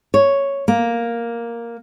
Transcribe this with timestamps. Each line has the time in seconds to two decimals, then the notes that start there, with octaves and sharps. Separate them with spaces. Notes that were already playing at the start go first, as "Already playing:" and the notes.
0.14 C#5
0.68 A#3